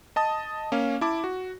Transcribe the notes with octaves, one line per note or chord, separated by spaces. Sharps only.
D#5 A5 D#6
A#3 C#4 F5
E4 A5 D6
F#4